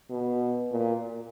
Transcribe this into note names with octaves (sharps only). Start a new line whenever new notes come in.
B2
A#2